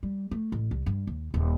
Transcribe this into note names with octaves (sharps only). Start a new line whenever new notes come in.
G3
A3
A1
C2
G2
D#2
D#1